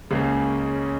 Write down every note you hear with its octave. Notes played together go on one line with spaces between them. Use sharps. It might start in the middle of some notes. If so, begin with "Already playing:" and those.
C#2 C#3 G#3 A#3 C#4